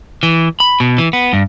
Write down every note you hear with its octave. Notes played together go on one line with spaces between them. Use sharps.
E3
B5
B2
E3
B3
G2